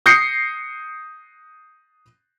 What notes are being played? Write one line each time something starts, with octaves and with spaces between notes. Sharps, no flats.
D#6 G6 A#6 C7 C#7